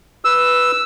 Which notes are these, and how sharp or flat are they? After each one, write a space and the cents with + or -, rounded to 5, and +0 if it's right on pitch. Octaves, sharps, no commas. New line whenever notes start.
B4 +0 E6 +0